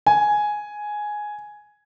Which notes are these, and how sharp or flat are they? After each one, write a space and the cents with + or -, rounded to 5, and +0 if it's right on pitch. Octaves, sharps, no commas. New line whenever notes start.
G#5 +5